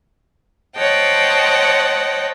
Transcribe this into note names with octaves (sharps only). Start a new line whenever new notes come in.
C5 C#5 D#5 F#5 G5 A5